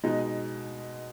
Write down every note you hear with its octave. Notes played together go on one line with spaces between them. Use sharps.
B2 G#3 D#4